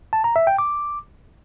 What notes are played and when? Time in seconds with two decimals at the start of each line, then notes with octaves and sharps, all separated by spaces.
0.13 A5
0.24 A#5
0.36 E5
0.47 G5
0.59 D6